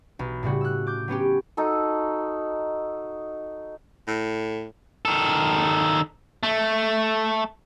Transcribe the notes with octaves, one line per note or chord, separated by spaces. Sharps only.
B1
A2 C#3 G3 F#4
E6 F#6
D6 G6
F#3 B3 C#4 G4
D#4 F#4 A4
A2
D#3 A4
A3